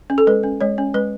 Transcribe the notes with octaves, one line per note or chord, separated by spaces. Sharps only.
C#4
A4
G#3 B4
C#4
G#3 C#5
C#4
G#3 B4